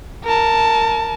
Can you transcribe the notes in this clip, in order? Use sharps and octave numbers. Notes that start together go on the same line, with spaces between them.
A#4 A5